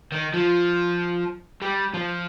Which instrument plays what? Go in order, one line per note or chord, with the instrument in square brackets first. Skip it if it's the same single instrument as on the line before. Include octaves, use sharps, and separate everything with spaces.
[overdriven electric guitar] D#3
F3
G3
F3